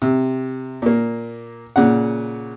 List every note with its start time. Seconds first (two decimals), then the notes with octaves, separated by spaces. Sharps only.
0.02 C3
0.82 A#2 A#3
1.76 A#2 C#3 F#5